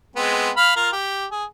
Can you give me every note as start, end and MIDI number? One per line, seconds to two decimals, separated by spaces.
0.16 0.50 56
0.16 0.50 59
0.16 0.50 60
0.57 0.72 77
0.57 0.72 83
0.57 0.72 89
0.76 0.90 65
0.76 0.90 70
0.76 0.90 77
0.92 1.26 67
1.31 1.45 68